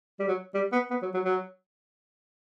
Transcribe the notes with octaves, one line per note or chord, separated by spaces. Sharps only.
G3
F#3
G3
B3
B3
F#3
F#3
F#3